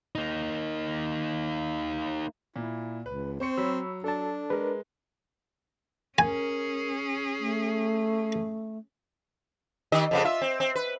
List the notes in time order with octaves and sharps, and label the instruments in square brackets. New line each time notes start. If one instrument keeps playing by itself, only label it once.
[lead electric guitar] A#3 D#4
[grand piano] A#2 [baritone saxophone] E4
[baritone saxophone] C#2 [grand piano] B4
[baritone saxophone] C4 [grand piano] C5 C#6 C#7
[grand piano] F#3 [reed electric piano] C#5 B5 E6
[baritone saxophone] D4 [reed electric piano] A4 A5
[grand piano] G#3 [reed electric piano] A#4 B4
[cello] C#4 G#4 [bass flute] A#4 [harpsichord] G#5
[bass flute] A3
[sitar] D#3 G4 D#5
F2 C#3 B3
F4 E5
C4
C4
B4